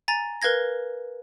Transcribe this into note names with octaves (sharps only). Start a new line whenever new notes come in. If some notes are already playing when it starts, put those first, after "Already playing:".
G#5 A#5 A6
A#4 B4 F5 G#6 A#6